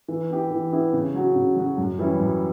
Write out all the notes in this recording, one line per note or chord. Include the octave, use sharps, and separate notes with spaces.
E3
B3 E4 G4
E3
B3 E4 G4
C#3
F#3 C#4 F#4
C#3
F#3 C#4 F#4
F#2
E3 G3 C#4 E4
F#2